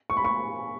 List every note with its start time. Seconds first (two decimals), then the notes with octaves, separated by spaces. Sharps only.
0.10 C#6
0.17 B5
0.25 C#6